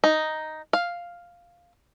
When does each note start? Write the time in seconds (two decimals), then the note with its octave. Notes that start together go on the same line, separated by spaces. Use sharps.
0.04 D#4
0.73 F5